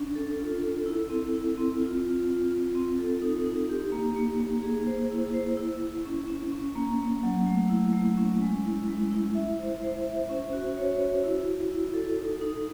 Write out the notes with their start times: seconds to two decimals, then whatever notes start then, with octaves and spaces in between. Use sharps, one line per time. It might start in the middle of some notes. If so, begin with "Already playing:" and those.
Already playing: C#4 D4
0.15 A4
0.39 F4
0.63 A4
0.86 E4
1.10 C4
1.34 E4
1.57 C4
1.80 F4
2.03 F4
2.27 F4
2.51 F4
2.75 C4
2.99 A4
3.22 D#4
3.46 D#4
3.69 G4
3.92 A#3
4.16 A#3
4.40 A#3
4.63 G#4
4.87 C5
5.11 E4
5.34 C5
5.57 E4
5.82 E4
6.06 C#4
6.28 C#4
6.52 C#4
6.76 A#3
6.99 A#3
7.23 F#3
7.46 A3
7.69 E4
7.93 A3
8.17 C#4
8.41 G#3
8.65 E4
8.88 G#3
9.11 E4
9.35 E5
9.59 C5
9.82 C5
10.06 E5
10.29 C#4
10.53 F#4
10.77 C#5
11.00 F#4
11.24 E4
11.47 E4
11.71 E4
11.94 A4
12.19 D#4
12.41 D#4